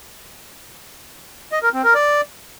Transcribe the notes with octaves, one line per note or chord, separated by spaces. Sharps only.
D#5
A#4
C4
A#4
D5